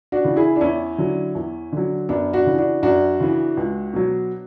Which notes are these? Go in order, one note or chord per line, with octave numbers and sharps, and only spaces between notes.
D4 F#4
C#3 E3
E4 G#4
D4
E2 C#4 E4
D3 F#3
E2
D3 F#3
F#2 B3 D4
D4 F#4
C#3 E3
D4 F#4
F#2 D4 F#4
C#3 E3
C#2
B2 F#3